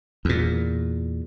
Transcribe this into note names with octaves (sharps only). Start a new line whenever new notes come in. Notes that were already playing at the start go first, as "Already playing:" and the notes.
E2 A#2